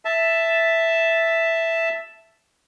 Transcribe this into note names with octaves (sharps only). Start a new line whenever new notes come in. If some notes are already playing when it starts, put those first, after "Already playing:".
E5 A5